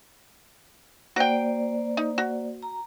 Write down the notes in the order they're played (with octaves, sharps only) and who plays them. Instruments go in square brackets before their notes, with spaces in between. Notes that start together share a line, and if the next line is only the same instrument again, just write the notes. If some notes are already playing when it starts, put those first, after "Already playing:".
[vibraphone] A#3 C5 D5 [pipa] F#4 G5
[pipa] D#4
F#4
[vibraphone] A#5